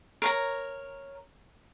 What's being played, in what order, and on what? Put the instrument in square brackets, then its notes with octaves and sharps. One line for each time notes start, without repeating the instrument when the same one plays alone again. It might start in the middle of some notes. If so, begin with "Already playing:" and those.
[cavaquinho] A#4 C#5 A#5